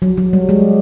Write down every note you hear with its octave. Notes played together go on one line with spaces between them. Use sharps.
F#3
F#3
G3
G#3